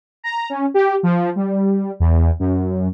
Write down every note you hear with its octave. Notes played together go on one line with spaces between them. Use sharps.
A#5
C#4
G4
F3
G3
E2
F#2